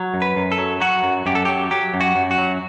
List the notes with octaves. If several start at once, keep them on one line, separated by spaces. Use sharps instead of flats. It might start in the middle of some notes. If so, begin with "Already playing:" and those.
Already playing: F#3
F#2
B4
F#2
A4
F#3
F#3 F#4
F#2
F#2 G4
A4
F#3 G4
F#3 G4
F#2
F#4
F#2
F#4
F#3